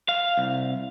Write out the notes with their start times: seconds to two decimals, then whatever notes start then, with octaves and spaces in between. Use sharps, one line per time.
0.09 F5
0.37 C2